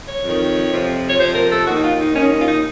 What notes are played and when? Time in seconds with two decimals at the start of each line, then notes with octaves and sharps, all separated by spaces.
0.08 C#5
0.24 F2 D#3
0.71 F2 C3 F3
1.09 C#5
1.18 F2 C3 F3 C5
1.34 A#4
1.50 A4
1.66 D#2 D#3 F#4
1.76 D#4
1.82 F4
1.98 D#4
2.13 D#2 D#3 C#4
2.30 C#4
2.38 F4
2.46 D#4